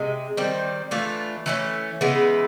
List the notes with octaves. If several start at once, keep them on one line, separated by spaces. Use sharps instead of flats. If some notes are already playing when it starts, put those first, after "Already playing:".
Already playing: C3 G#3
D#3 G3 C4
E3 A3 D4 F4
E3 A3 C#4
C#3 E3 G#3 B3